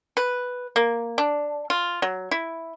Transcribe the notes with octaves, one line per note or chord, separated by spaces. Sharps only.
B4
A#3
D4
F4
F#3
E4